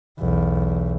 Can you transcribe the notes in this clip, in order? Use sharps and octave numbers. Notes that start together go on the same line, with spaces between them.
B1 E2